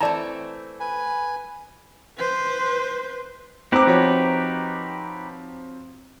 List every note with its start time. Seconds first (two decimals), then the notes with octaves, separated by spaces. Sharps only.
0.01 E3 A3 C4 D5 A5 A#5
0.80 B4 G#5
2.18 B4 C5
3.72 C4 D#4 G4 B4 A#5 D6
3.87 F3 F#4 C#5